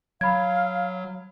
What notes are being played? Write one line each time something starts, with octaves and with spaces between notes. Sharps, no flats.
F#3 F5 B5 G#6